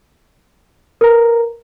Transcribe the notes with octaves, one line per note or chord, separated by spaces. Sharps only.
A#4 B4 A#5